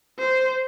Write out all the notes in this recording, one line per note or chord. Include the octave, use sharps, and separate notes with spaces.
C5